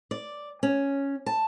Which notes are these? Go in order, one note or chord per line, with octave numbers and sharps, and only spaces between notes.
D5
C#4
A5